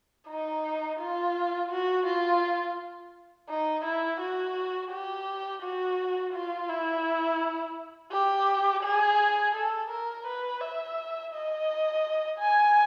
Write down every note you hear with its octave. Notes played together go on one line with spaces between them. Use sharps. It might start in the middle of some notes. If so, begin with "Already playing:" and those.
D#4
F4
F#4
F4
D#4
E4
F#4
G4
F#4
F4
E4
G4
G#4
A4
A#4
B4
E5
D#5
G#5